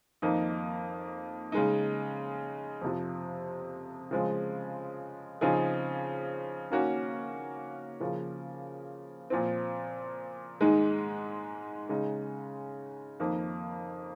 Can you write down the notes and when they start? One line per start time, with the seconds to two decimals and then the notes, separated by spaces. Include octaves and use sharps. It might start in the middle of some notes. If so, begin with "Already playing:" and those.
0.22 F2 D#3 A#3 D#4
1.52 C#3 G#3 D#4
2.81 F2 C3 F3
4.11 C#3 F3 G#3 C4
5.41 C#3 F3 C4 D#4 G#4
6.70 D#3 A#3 C#4 F#4
8.00 C#3 F3 A#3
9.30 A#2 F3 C4
10.61 G#2 D#3 G#3 D#4
11.89 C#3 G#3 D#4
13.20 F2 D#3 A#3